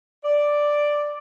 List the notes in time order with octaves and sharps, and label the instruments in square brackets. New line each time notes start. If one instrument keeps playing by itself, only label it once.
[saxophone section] D5